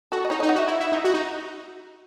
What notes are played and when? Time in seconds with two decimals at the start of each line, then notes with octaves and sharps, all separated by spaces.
0.12 F#4 A4
0.25 D#5
0.30 D#4 C#5
0.40 D#4 D#5
0.49 F#5
0.56 F#4 E5
0.68 E4
0.80 E4
0.92 D#4
1.04 F#4
1.14 D#4